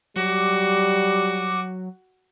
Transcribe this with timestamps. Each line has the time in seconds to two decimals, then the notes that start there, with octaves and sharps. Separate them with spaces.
0.16 F#3 G3 F#4 D6